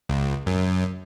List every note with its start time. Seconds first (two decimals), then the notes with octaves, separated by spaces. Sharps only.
0.09 C#2
0.46 F#2